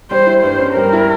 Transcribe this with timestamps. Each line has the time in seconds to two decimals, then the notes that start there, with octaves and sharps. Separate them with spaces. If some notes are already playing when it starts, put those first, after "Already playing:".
0.11 G3 C5
0.27 E4
0.43 G2 C5
0.60 C#4
0.76 G3 A#4
0.93 E4